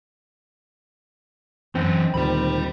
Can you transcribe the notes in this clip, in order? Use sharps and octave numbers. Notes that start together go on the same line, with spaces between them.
F#2 E3 C4 D4
D2 A#2 D#3 G3 G5 B5